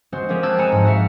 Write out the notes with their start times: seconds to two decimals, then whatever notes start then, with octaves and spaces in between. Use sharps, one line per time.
0.12 G#3 C4 F#4 C5
0.29 F3 C4 G4 G#4 A#4
0.43 G5 A5 D6 E6 F#6 G#6
0.58 G#3 G#5 A#5 F#6 C#7 E7
0.72 G#2 F3
0.85 F#4 E5 F5